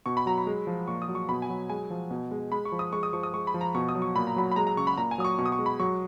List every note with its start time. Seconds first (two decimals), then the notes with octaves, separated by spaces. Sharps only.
0.06 B2 C#6
0.17 B5
0.26 F#3 A#5
0.38 B5
0.47 G#3
0.67 F3
0.88 A#2 C#6
1.02 D#6
1.08 F#3
1.15 C#6
1.29 B2 B5
1.42 G#5
1.50 F#3
1.70 G#3 G#5
1.90 F3
2.11 B2
2.31 G#3
2.52 G#3 B5
2.65 C#6
2.72 F3
2.79 D#6
2.93 G#3 C#6
3.03 D#6
3.13 F3 C#6
3.23 D#6
3.34 G#3 C#6
3.47 B5
3.54 F3
3.61 A#5
3.75 B2 C#6
3.89 D#6
3.95 F#3
4.02 C#6
4.16 A#2 B5
4.27 A#5
4.36 F#3 B5
4.52 B5
4.56 G#3 A#5
4.67 A#5
4.77 C#3 C#6
4.87 B5
4.98 A#2 A#5
5.11 G#5
5.18 F#3 D#6
5.25 C#6
5.38 B2 C#6
5.46 D#6
5.52 C#6
5.59 G#3
5.66 B5
5.80 F#3 C#6